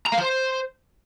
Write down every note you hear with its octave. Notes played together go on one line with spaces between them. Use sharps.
A#5
F5
C5